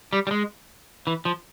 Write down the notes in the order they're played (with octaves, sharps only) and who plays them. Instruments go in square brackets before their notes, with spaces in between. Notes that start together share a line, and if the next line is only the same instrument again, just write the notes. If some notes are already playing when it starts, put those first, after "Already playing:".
[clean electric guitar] G3
G3
G#3
E3
F3